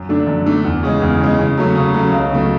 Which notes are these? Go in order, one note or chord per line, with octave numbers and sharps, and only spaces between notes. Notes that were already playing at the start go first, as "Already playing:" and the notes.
Already playing: F#2
D3 A3 D4
F#2
D3 A3 D4
E2
C#3 G#3
E2
C#3 G#3
C#3
F#3 A3 C#4
C#3
F#3 A3 C#4
C#2
C#3 F#3 A3